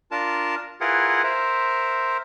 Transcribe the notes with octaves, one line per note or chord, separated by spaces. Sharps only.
D4 F4 A#4 A5
E4 F4 G#4 A#4 B4 F#5
A#4 C5 E5